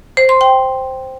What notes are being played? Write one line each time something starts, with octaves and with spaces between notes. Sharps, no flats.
C5
C6
G5